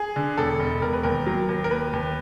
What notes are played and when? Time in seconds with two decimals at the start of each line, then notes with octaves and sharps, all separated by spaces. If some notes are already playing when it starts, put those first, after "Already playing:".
Already playing: G#4
0.16 D3
0.37 E1 A4
0.60 E1
0.82 E1 A#4
0.93 B4
1.03 D#2 A#4
1.26 F#3
1.49 D#2
1.64 A#4
1.70 D#2 B4
1.93 D#2